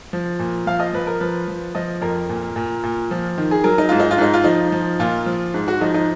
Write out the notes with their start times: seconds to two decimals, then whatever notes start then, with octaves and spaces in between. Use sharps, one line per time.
0.13 F3
0.39 A#2
0.67 F3 F5
0.80 D#5
0.93 F3 B4
1.07 A#4
1.20 F3 B4
1.48 F3
1.75 F3 D#5
2.02 F2 A#4
2.29 A#2
2.56 A#2
2.83 A#2
3.11 F3
3.38 D#3
3.51 G#4
3.64 F#3 A#4
3.78 D#4
3.89 G#2 F4
4.00 D#4
4.11 F4
4.18 G#2 D#4
4.34 F4
4.44 F3 D#4
4.72 F3
4.99 A#2 F4
5.26 F3
5.54 G#2
5.68 F#4
5.81 F3 D#4
5.94 D#4